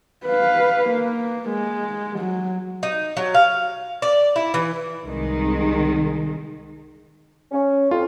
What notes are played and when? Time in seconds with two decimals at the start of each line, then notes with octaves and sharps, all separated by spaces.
0.25 B4 F5
0.89 A#3
1.49 G#3
2.19 F#3
2.83 D#4
3.17 F#3
3.34 F5
4.02 D5
4.36 E4
4.54 E3
5.03 C2 D#3 G#3
7.52 C#4
7.91 F2 F4